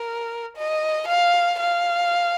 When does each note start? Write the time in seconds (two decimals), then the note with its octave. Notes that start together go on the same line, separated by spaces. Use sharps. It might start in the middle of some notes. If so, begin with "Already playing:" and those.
Already playing: A#4
0.57 D#5
1.08 F5
1.60 F5